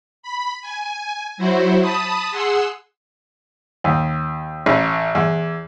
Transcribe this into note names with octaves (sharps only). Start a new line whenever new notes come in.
B5
G#5
F#3 E4 F#4 C5
A5 B5 D#6
G#4 F#5 C6 E6
D#2
A1
E2